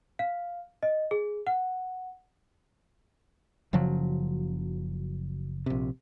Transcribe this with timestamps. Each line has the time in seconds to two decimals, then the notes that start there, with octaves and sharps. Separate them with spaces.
0.19 F5
0.83 D#5
1.11 G#4
1.47 F#5
3.73 F#1 C#3 F3 F#3
5.66 A#1 C3